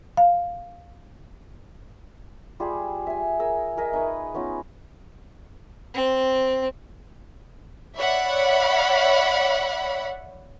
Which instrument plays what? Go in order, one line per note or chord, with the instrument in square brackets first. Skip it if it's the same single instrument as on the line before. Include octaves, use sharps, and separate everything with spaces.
[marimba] F5
[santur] G3 F4 G4 G#4
E5 G#5
G#4 A#4 E6
G#4 A#4 D#5 E5
D#4 B4 C#6
B3 C#4 D#4 F4
[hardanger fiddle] C4
[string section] C#5 D5 E5 F#5 B5